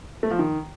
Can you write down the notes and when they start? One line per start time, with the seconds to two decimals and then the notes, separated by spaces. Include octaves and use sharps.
0.23 A3
0.31 F3
0.39 D#3